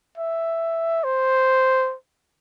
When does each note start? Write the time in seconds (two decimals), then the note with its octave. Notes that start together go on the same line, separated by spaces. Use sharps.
0.18 E5
1.04 C5